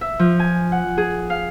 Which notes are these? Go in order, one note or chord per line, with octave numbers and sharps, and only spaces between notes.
E5
F3
G#5
F#5
G#4
F5